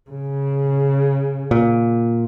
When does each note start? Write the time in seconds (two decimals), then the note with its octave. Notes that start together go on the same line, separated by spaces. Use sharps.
0.10 C#3
1.51 A#2